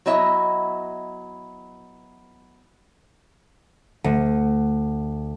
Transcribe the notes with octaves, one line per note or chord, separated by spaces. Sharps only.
F#3 B3 E4 D#5 E5
D2